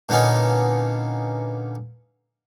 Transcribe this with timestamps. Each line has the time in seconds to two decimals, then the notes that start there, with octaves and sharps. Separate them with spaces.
0.09 A#2 D3 B3 C#4 D#4